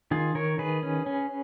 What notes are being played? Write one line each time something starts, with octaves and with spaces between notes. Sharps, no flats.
D#3 F4 G#4
D#3 A#4 C#5
D#3 G#4 B4
C#4
C#4